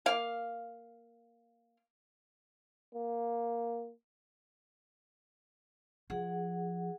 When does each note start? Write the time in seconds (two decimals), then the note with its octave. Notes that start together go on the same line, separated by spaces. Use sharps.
0.06 A#3 F5
2.94 A#3
6.10 F3 G#4 F#5